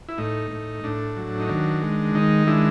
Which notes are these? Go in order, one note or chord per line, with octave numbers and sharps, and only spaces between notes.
E4
A2 D#4
A2
A2 D4
F#3
D#4
D#3 D4
G#3
D#3 D#4
G#3 D4 E4